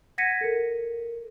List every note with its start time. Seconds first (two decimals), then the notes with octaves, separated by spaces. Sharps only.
0.18 F#5 G#6 A#6 B6 C#7 D#7
0.41 A4 A#4